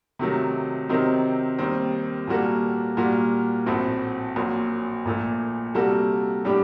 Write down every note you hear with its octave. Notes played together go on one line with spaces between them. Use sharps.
C3 D#3 F#3 A3
C3 D#3 F#3 C4 D#4
D#2 D#3 G3 C4
A#2 G3 A#3 F#4 A4
A#2 G3 A#3 F#4
A#1 A2 A3 C4 F#4
A#1 A#2 F#3
A#1 A#2 A3
C3 G3 A#3 F#4 A4
A2 G3 D4 G4